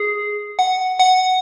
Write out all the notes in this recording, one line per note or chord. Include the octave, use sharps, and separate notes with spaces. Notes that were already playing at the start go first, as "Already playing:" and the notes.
Already playing: G#4
F#5
F#5